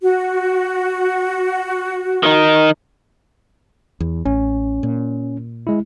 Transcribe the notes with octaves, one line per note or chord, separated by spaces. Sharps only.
F#4
D#3 D#4
E2
A1 C#4
A#2
G#3 E4